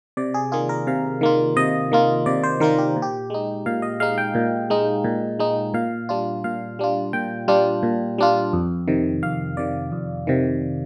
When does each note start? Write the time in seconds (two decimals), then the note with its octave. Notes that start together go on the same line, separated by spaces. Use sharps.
0.17 C3 D5
0.34 G#4
0.52 D#3 A#3 F4 G#4
0.69 A#4
0.87 C3 F5
1.21 D#3 A#3 F4
1.56 C3 D#5
1.92 D#3 A#3 F4
2.26 C3 D5
2.43 C5
2.60 D#3 A#3 F4 A#4
2.78 G4
2.96 A#2
3.02 G4
3.30 G#3 D#4
3.66 A#2 F5
3.82 D#5
4.00 G#3 D#4 F5
4.18 G5
4.35 A#2
4.70 G#3 D#4
5.04 A#2
5.39 G#3 D#4
5.74 A#2 F5
6.09 G3 D4 F4
6.44 A#2 F5
6.79 G3 D4 F4
7.13 A#2 G5
7.48 G3 D4 F4
7.83 A#2
8.18 G3 D4 F4
8.53 F2
8.88 C3 D#3
9.23 F2 F5
9.57 C3 D#3 D5
9.92 F2
10.27 C3 D#3